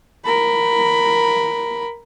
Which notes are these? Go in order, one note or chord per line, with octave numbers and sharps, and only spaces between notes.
A#4 B5